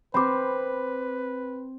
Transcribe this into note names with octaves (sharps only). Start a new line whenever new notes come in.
C4 B4 B5 D6